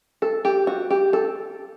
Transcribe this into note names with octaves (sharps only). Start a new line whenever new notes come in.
A4
G4
F#4
G4
A4